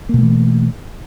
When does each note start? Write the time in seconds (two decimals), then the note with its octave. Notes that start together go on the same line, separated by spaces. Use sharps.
0.09 A#3
0.14 B2
0.18 A3
0.23 E3